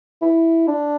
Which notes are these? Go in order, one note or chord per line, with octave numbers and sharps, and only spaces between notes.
E4
D4